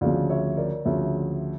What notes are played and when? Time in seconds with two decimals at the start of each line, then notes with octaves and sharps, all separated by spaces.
0.01 D2 C#3 F3 D5 F5
0.30 C#5 E5
0.57 A#4 D5
0.85 D2 C#3 F3 C#5 E5